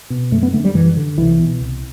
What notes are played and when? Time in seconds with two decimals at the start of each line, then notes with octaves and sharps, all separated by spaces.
0.10 B2
0.32 F#2 A3
0.43 B3
0.53 D3 A3
0.65 G3
0.74 F#2 E3
0.97 D3
1.18 C2 E3
1.39 B2
1.60 C2